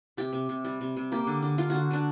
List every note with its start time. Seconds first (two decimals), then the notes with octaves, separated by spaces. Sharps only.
0.17 C3 G4
0.33 C3
0.49 C3
0.65 G3
0.81 C3
0.96 C3
1.12 A#3 G4
1.27 D3
1.42 D3
1.58 D3 F4
1.70 D3 F#4
1.91 D3 D4